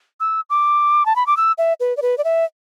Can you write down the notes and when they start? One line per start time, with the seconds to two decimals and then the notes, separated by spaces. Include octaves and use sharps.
0.20 E6
0.50 D6
1.06 A5
1.16 B5
1.27 D6
1.37 E6
1.58 E5
1.80 B4
1.97 D5
2.02 B4
2.18 D5
2.24 E5